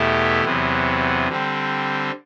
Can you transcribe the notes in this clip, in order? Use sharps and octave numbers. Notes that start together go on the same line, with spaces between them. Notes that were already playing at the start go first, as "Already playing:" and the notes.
Already playing: E2 B2 A3 E4 G4
E2 C3 F#3 B3
D3 G3 C4